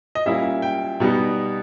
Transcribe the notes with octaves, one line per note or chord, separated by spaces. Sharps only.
D#5
A#2 G3 A#3 C#4 E4 E5
G5
B2 G3 B3 D#4